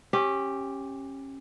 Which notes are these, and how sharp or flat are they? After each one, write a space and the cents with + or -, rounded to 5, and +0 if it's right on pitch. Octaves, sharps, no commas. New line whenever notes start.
C#4 -25 G4 +0